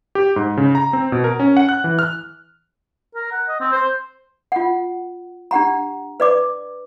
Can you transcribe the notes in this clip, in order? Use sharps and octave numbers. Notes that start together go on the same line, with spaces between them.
G4
G#2
C#3
A#5
C4
B2
A#4
C#4
F#5
F#6
E3
F6
A#4
F#5
D#5
C4
C5
F4 F#5
D4 G4 F#5 A#5
B4 D5 D6